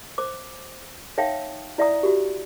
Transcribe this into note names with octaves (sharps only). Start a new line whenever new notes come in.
C5 D6
D#4 C#5 E5 F5 G5 A5
E4 D5 E5 F#5 A#5 D#6
F#4 G4